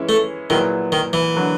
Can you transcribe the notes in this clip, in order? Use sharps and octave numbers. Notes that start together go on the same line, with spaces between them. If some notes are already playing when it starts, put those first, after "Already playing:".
Already playing: E3 G#3 C#4 E4
A3
A#2 D#3 F#3 B3 E4 G#4
D#3
E3
D3 F#3 A#3